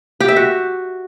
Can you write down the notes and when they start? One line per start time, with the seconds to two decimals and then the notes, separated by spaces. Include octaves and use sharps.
0.20 G4
0.28 E5
0.36 F#4